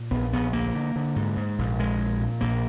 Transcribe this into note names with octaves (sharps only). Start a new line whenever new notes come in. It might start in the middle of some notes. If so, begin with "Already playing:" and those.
Already playing: A#2
A#1 B3
A#1 B3
D2 A#3
D3
D3
G#2
G#2
A#1
A#1 G#3
A#2
A#2
A#1 A#3